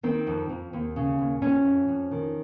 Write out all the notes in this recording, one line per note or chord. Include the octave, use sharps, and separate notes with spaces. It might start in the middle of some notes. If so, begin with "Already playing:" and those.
D#3 C4
F2
F2
D#2
C#3
D#2
F2 C#4
F2
F2
D#3